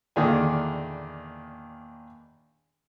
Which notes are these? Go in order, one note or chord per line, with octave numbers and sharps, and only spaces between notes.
E2 A#2 D3 D#3 D4 G#5